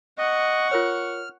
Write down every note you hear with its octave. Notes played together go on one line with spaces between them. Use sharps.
D#5 F#5 C#6
F4 A#4 C#5 F6